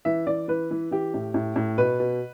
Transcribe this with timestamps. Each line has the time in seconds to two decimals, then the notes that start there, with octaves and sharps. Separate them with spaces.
0.05 E3 E5
0.27 E3 D5
0.48 E3 B4
0.71 E3
0.91 E3 G4
1.14 A2
1.34 A2
1.56 A2
1.78 B2 B4
2.00 B2